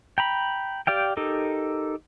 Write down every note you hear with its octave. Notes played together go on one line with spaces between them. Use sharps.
G5 A#5 B5
G4 D5 F5 G5
D#4 G4 A4 A#4